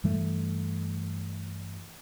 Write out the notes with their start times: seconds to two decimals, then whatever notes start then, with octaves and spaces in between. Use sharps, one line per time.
0.04 G2 E3 G3 A3